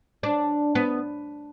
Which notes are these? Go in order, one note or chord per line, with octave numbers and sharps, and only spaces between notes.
D4
B3